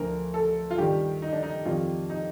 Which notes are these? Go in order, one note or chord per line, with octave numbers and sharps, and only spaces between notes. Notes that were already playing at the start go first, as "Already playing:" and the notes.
Already playing: D2 D3 F3 A#4
A4
F4
G2 D#3 G3 G4
D#4
D4
D#4
F2 D#3 G3 F4
D#4